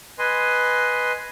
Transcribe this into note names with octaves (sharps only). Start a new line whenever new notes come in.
B4 D#5 G#5 C6